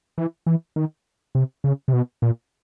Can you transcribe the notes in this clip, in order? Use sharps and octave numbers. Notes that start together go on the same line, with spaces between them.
E3
E3
D#3
C3
C#3
C3
B2
A#2